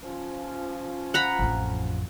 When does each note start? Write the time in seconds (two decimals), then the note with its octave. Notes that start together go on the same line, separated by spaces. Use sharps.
0.03 F3 C#4
1.14 F#5 A#5 B5
1.39 A1 F2